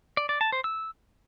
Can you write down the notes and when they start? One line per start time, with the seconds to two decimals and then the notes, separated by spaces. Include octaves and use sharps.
0.17 D5
0.29 D5
0.41 A5
0.52 C5
0.64 E6